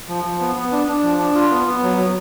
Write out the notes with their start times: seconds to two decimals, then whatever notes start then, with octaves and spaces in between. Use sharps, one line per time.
0.08 F3
0.24 F3
0.40 B3
0.55 B3
0.72 D4
0.88 D4
1.03 F3
1.19 D4
1.35 F4
1.51 B3
1.67 B3
1.83 F#3
1.98 F#3